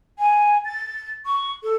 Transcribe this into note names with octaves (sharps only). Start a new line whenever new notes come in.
G#5
A6
C#6
A4